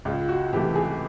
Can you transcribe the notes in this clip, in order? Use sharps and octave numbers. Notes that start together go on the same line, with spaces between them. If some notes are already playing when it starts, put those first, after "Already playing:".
C#2 F4
F#4
C3 E3 A3 G4
G#4